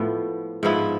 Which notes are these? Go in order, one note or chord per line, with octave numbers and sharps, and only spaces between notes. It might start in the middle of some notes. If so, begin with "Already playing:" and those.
Already playing: A2 F3 B3
G#2 F3 B3 E4